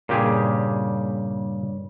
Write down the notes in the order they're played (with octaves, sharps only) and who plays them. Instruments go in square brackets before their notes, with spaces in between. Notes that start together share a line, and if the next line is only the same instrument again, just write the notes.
[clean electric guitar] G2 C#3 [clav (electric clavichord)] A#2 G4 G#4